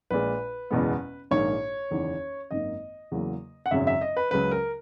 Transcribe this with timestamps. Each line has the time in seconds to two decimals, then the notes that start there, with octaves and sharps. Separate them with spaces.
0.11 A#1 A#2 G#3 B4
0.71 F#1 E2 B2 G#3 B3
1.31 A#1 G#2 D#3 A#3 C#5
1.91 F#1 E2 D#3
2.51 G#1 F#2 D#3 A#3 D#5
3.11 E2 C#3 F#3 A#3
3.66 F#5
3.71 G#1 F#2 C#3 F#3 E5
3.87 E5
4.01 D#5
4.17 B4
4.31 C#2 C#3 F#3 B4
4.51 A#4